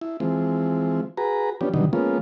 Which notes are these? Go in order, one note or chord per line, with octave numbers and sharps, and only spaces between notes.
E4
E3 F3 G#3 C4
F#4 G#4 B4 A#5
F3 B3 C#4 D4 G4
B2 D3 D#3 F#3 G3 D#4
F3 G#3 A#3 B3 C#4 F4